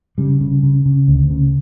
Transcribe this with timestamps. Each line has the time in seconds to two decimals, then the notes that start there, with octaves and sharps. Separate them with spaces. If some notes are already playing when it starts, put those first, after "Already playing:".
0.18 C#3 G3
0.41 C#3
0.63 C#3
0.86 C#3
1.08 D2
1.30 C#3